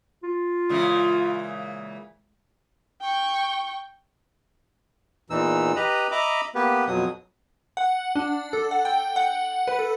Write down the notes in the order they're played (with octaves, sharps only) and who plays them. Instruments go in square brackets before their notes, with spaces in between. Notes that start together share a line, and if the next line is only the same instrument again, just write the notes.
[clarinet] F4
[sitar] A#2 C#3 E3 [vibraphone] G#3 E5
[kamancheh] G5 C#6
[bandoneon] E2 A#2 E3 D#4 E6
G4 B4 D#5 A#5 B5
D#5 E5 A#5 B5 D6
A#3 B3 G4 B4
F2 B2 F#3 D#6
[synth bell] F#5
D4
A4
F#5
G5
F#5
B4
A4